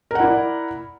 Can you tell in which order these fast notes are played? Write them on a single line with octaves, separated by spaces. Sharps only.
A#4 F#5 E4 D5